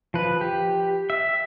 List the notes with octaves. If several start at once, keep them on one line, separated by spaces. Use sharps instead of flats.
F3 B4
G4
E5